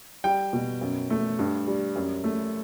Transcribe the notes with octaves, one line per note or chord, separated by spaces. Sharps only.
G3 G5
B2
F#2
A3
G2
G3
F#2
A3